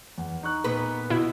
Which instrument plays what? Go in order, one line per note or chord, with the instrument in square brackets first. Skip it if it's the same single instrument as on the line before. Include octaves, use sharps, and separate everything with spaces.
[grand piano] E2
D#4 C#6 F#6
[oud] A#2 B3 B4
[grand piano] B2 [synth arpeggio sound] E4